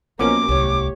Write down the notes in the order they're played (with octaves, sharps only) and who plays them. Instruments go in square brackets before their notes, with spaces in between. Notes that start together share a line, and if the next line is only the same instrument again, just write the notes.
[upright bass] B1 [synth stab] B2 F3 C#4 [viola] A#3 A#4 [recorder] D6
[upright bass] D1 C2 [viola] G4 C#5